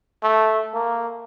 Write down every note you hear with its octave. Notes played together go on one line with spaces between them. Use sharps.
A3
A#3